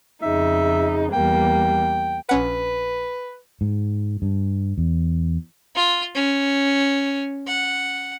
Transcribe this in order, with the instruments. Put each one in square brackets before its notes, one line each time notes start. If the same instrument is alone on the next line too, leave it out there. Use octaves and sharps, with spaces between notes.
[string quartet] F2 C#3 D#4 [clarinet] E5
[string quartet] E2 G3 A#3 [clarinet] G5
[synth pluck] A#1 C#4 F#5 [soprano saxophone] B4
[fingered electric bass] G#2
G2
E2
[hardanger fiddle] F4
C#4
F#5